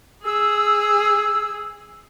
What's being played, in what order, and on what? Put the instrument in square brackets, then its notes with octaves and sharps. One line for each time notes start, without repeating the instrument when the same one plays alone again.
[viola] G#4 [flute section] E6